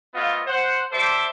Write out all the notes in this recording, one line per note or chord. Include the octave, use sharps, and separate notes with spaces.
A3 B3 F4 C5 D#5 F5
C5 F#5
G3 A4 C5 E5 C6 D6